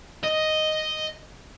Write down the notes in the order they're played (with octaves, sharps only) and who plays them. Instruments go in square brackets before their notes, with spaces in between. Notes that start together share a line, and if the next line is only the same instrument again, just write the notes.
[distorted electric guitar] D#5